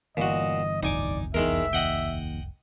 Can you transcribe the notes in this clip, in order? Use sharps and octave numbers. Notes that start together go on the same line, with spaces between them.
G1 A#2 E3 F#4 D#5
F1 C2 D#4 D5 G#5 D6
E2 D#3 G#3 A#4 E5
D#2 D#5 F#5 G5